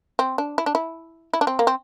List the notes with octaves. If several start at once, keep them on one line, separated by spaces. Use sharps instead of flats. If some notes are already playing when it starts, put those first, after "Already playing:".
C4
D4
E4
D4
E4
E4
D4
C4
A#3
C4